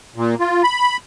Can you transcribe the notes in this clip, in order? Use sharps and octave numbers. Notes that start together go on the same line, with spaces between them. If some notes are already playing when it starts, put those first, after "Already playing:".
A#2
F4
B5